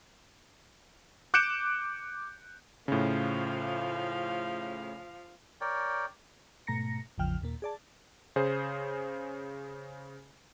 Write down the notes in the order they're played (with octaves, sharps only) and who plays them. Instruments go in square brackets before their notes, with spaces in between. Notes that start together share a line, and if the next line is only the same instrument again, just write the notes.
[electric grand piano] D6 F#6 G6 C#7 D7 E7
[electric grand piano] A2 C#3 [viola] F3 F5
[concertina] A#4 C#5 D5 G5
[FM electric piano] G#2 B2 A3 A#5 A#6 C#7
A1 E2 C#3 F3 G5 F6
D#2 A#2 A#3
G#4 D5 A5
[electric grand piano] C#3 G#4 C5